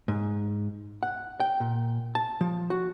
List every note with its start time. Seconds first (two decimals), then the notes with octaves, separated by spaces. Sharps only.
0.08 G#2
1.03 F#5
1.40 G5
1.60 A#2
2.15 A5
2.41 F3
2.70 F#4